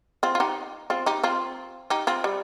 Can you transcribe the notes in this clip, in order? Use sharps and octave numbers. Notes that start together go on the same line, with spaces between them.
C4 F4
F4
D#4 G4
C4 F4
D#4 G4
C4 F4
D#4 G4
C4 F4
G3